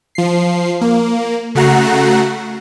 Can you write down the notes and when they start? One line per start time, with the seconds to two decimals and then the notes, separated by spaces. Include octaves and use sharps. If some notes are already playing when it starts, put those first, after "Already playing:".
0.15 F3 C7
0.81 A#3
1.55 C#3 A3 F#4 F#5 A#5 C7